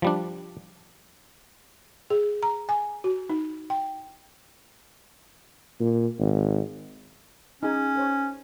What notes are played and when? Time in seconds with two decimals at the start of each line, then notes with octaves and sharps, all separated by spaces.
0.02 F3 G3 D4
2.10 G#4
2.43 A#5
2.69 G#5
3.04 F#4
3.30 D#4
3.70 G5
5.80 A#2
6.19 G#1
7.63 C#4 D#4 G#4 G#5
7.95 A#4 C5 C#5